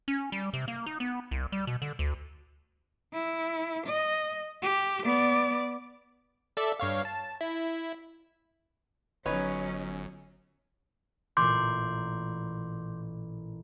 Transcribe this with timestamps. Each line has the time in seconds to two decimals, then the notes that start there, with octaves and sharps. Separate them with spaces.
0.08 C#4
0.32 G3
0.53 C3
0.68 A#3
0.86 D#4
1.00 B3
1.31 C2
1.52 G3
1.67 B2
1.82 D3
1.99 D2
3.14 E4
3.87 D#5
4.62 G4
5.04 B3 D5
6.57 A4 D5 E5
6.80 G2 C#5 F5
7.05 A5
7.41 E4
9.26 G1 F#3 C#4 D#4 B4 C#5
11.37 A1 A#2 C6 D6 G6